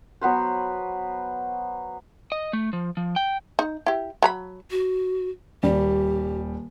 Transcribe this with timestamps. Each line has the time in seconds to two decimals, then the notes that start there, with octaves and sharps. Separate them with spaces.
0.21 F#3 B3 B4 C5
2.32 D#5
2.53 A3
2.73 F3
2.97 F3
3.16 G5
3.59 D#4
3.86 E4 G4
4.22 F#3 A#5 B5
4.71 F#4
5.63 D#1 G3 G4